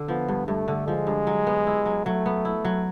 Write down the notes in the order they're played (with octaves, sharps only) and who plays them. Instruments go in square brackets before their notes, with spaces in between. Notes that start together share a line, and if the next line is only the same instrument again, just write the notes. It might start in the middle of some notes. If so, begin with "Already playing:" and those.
Already playing: [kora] D3
[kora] F3 [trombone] B3
[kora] G2
[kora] G2 [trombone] A3
[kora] D3
[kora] F3 [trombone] G#3
[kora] G2
F#3
B3
E4
F#3
[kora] F#3 [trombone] A3
[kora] B3
E4
F#3